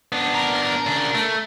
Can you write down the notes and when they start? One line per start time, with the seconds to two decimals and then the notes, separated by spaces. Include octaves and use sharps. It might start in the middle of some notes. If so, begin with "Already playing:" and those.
0.12 B3 D4
0.35 A#4
0.86 C#3 D4
1.14 A3